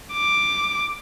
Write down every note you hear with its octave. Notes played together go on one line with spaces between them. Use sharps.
D6